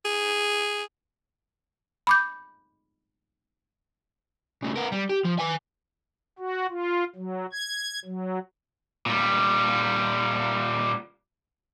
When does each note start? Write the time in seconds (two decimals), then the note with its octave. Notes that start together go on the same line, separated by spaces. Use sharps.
0.05 G#4
2.07 B5 D6 G6
4.63 C#3 A3
4.76 B3 A#4
4.92 G3
5.09 G4
5.24 F3
5.39 B4 G#5
6.39 F#4
6.70 F4
7.16 F#3
7.52 G#6
8.05 F#3
9.06 A#2 G3